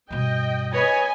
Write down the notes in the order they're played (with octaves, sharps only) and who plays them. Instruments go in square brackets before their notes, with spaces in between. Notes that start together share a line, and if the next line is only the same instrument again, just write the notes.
[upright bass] G2 B2 [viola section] D#5 G5
[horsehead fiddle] B4 C#5 [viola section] D#5 G#5